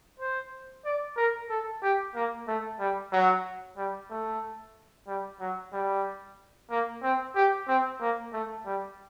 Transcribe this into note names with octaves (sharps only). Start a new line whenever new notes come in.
C5
D5
A#4
A4
G4
A#3
A3
G3
F#3
G3
A3
G3
F#3
G3
A#3
C4
G4
C4
A#3
A3
G3